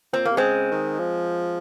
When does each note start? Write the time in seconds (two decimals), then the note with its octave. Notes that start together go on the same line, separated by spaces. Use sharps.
0.13 A#2 C4
0.25 A#3
0.30 C3
0.37 C#3 G#3 C4
0.71 D#3
0.99 F3